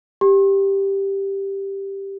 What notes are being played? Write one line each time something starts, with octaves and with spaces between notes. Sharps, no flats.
G4